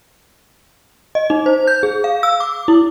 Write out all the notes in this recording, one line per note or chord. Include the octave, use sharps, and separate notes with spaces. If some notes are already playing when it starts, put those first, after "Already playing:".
D#5
D#4
C5
G6
G#4
F5
E6
D6
E4